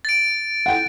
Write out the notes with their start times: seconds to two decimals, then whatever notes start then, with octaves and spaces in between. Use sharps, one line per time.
0.05 A6 D7
0.66 F#5 G5